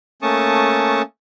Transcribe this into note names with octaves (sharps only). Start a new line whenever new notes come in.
A3 A#3 C#4 A5 C#6 D#6